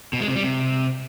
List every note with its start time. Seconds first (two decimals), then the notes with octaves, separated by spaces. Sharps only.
0.13 B2
0.21 G#3
0.28 C3
0.36 G3
0.43 C3